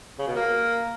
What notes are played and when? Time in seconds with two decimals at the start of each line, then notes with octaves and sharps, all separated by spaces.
0.19 C#3
0.27 B2
0.35 A#3